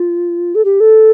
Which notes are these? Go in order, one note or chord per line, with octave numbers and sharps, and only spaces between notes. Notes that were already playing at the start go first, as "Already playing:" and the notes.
Already playing: F4
A4
G4
A4